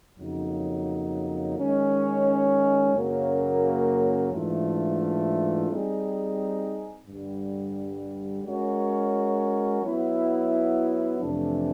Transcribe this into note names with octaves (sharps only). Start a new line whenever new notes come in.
F2 C#3 F#3 A#3 D#4
D#3 G#3 C#4
F#2 C#3 F#3 A#3 C#4
G#2 E3 A3 D4 F4
G3 C4 D#4 G#4
G2 D3 G3
G#3 C#4 F#4 A#4 C#5
F#3 B3 E4
F2 C3 E3 A3 D4